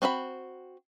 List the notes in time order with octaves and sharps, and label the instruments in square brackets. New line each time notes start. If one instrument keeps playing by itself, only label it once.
[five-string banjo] C4 F#4 F5 B5